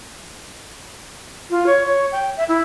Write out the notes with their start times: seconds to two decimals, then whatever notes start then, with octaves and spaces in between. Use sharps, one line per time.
1.50 F4
1.66 C#5
1.86 C#5
2.12 G5
2.37 E5
2.49 E4